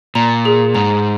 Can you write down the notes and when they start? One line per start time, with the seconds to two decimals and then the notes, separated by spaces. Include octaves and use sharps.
0.15 A#2 A#5
0.45 G#4
0.75 G#2 A#5